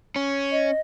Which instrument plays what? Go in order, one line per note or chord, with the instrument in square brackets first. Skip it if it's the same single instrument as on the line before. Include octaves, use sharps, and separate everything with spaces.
[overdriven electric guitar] C#4
[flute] D#5